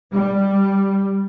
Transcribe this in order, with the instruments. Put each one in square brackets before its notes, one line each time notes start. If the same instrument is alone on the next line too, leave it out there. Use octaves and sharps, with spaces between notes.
[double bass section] G3